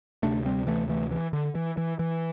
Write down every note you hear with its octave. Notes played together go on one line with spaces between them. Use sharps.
D2 C3 A3 D4
G3 C4
E3 A3
E3 A3
E3
D3
E3
E3
E3